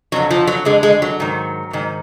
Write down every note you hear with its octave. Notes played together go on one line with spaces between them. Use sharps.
F2 D3 F#3
F3
F#3
F2 D3 G#3
G#3
F#3
G#2 D#3
G#2 D#3